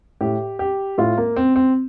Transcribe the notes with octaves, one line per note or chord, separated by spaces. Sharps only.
A2 G4
G4
A2 F4
A#3
C4
C4